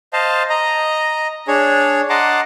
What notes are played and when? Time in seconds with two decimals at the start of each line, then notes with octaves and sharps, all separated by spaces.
0.13 C5 D#5 F5 A5
0.50 D#5 A#5
1.48 D4 G#4 C#5
2.10 D#5 F#5 A5 A#5 C6 D6